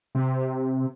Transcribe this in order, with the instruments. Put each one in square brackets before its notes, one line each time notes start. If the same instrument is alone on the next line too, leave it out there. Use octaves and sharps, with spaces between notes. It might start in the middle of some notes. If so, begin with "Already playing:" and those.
[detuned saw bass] C3